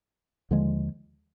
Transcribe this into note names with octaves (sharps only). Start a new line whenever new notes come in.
D#2 D3 F3 G#3